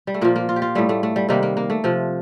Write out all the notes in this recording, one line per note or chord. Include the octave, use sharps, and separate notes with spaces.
G3
A3
A#2 F3 A#3
A#3
F4
G4
F4
A2 G3 A3
A3
A3
G3
C3 D#3 G3 A#3
A#3
A#3
A3
C3 F3